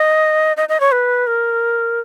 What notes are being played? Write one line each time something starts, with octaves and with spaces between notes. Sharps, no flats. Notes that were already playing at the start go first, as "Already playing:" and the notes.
Already playing: D#5
D#5
D#5
C#5
B4
A#4